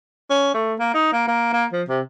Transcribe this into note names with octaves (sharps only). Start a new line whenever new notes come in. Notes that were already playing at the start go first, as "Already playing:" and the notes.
C#4
A3
A#3
D#4
A#3
A#3
A#3
F3
C3